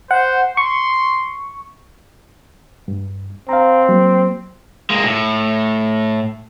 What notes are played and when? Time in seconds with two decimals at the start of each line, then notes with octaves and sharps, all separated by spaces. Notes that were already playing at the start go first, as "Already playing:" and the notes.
0.11 C5 F#5
0.57 C6 C#6
2.88 G2
3.49 C4 F5 A#5
3.89 F#3 A#3
4.90 G#3 A#3
5.03 A2